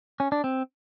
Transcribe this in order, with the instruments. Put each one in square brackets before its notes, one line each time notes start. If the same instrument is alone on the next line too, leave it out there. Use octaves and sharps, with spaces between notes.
[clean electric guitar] C#4
D4
C4